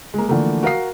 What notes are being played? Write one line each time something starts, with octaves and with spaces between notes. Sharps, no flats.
G#3 A#3
D3 E3 F3 A3 A#3
F#4 A#4 F5 C7